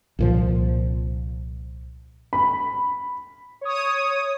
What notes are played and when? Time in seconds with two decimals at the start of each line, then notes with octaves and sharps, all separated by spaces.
0.19 C2 A#2 F3
2.33 B5
3.61 C#5 D#6